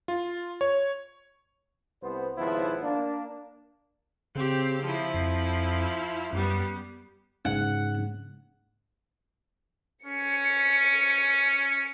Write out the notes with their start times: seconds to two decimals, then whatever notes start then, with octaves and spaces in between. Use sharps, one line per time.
0.08 F4
0.61 C#5
2.02 C2 B3 C5
2.38 G#1 D#2 C#3 F3 B3 E4
2.82 A#3 D4
4.35 C#3 C4 G4
4.82 F3 E4
5.14 F2
6.33 F#2 G3 B3
7.45 G#2 C#3 F#5
10.06 C#4 C#7